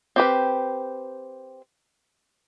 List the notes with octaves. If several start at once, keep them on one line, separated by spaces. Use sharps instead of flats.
C4 G4 B4